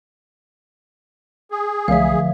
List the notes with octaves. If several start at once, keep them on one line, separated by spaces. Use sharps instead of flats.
G#4
C2 D3 F3 E5 F5